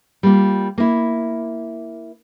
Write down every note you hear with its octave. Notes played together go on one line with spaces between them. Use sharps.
G3 A#3 F4
A#3 E4